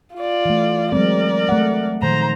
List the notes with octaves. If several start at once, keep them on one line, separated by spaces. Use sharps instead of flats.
F4 D5
E3 A3
F#3 G#3 C4 A#4 D5
A3 F#5
A#2 D#3 F3 C5 A#5